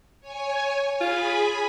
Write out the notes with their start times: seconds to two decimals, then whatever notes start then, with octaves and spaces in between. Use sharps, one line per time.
0.21 C#5 G#5
1.01 F4 G#4 G#5 B5